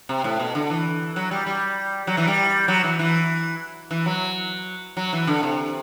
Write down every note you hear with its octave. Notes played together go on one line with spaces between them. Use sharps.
C3
A2
B2
D3
E3
F#3
G3
G3
F#3
E3
G3
F#3
E3
E3
E3
F#3
F#3
E3
D3
C3